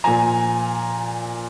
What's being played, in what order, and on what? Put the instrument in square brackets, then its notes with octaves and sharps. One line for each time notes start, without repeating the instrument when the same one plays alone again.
[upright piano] A#2 F3 G#5 A#5